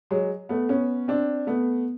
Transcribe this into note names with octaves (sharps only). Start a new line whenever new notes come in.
F#3 G#3
A3 B3
B3 C#4
C4 D4
A3 B3